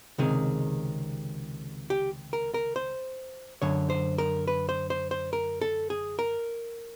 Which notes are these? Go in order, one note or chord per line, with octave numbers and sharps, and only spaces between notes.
C#2 C3 D#3 G#4
G4
A#4
A#4
C5
F#2 D3 C#5
C5
A#4
B4
C5
C5
C5
A#4
A4
G#4
A#4